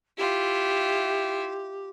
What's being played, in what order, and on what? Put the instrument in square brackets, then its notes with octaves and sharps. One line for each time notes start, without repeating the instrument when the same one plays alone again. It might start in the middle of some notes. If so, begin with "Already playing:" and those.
[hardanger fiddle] E4 F4 [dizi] G4